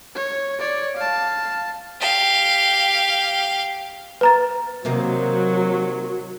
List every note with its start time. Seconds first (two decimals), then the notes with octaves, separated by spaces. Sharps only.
0.15 C#5
0.59 C#5 D5
0.96 F5 A5
2.00 G4 F5
4.21 B4 A#5 A6
4.85 C3 D#3 F#3 A#3